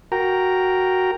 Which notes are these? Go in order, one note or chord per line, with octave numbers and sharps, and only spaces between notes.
F#4 A#4 G5 A#5